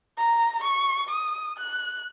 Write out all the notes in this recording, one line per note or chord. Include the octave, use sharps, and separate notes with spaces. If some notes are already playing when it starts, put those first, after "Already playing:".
A#5
C#6
D#6
F#6